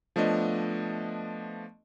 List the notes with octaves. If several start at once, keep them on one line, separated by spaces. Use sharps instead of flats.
F3 A3 B3 D4 D#5